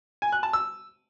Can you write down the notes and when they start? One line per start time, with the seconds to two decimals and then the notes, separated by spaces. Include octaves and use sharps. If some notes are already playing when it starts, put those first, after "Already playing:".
0.22 G#5
0.32 F#6
0.43 A5
0.53 E6